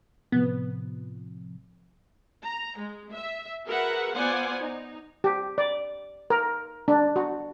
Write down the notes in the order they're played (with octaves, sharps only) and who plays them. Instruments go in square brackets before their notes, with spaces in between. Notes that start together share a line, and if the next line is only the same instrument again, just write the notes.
[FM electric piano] A2 C3 F3 [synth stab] B3
[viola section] A#5
G#3
E5
F#4 G#4 A#4 B4 E5 F#5
B3 F4 C5 D5 F#5 G#5
D#4
[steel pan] G4
D5
A#4
D4
F#4